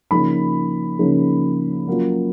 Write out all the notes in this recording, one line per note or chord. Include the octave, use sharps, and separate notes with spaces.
C#3 F3 A#3 D#4 B5
C#3 F3 A#3 D#4
F#3 A#3 C#4 F4